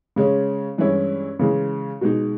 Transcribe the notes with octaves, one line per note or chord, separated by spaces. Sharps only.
C#3 G#3 C#4
G2 E3 G#3 C#4 E4
C#3 E3 G#3
B2 G#3 D#4